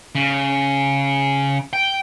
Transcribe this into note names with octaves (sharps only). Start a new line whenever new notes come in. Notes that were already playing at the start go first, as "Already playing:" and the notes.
C#3
G5